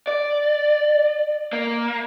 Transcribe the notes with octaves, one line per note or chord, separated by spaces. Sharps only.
D5
A#3